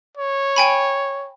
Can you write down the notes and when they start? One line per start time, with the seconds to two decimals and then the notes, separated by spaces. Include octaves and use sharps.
0.17 C#5
0.56 G5 G#5 B5